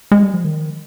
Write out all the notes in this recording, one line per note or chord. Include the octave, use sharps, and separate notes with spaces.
G#3
G3
F3
D#3